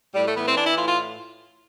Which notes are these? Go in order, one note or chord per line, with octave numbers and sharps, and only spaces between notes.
A2 G3
A3
E3 B3
C4
E3 D4
E4
A2 F4
F4